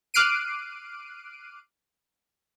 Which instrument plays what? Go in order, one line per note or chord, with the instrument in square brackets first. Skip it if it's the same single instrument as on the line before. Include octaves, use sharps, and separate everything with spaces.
[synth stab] D6 F6 F#6 C7 D7 D#7